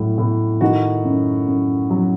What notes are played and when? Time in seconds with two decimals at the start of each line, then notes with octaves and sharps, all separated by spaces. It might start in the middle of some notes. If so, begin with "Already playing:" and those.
Already playing: A2 F#3
0.18 A2
0.61 D#3 F#4
1.05 F#2
1.48 F#2
1.90 F#3